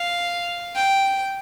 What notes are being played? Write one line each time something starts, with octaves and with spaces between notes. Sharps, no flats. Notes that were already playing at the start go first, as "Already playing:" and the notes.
Already playing: F5
G5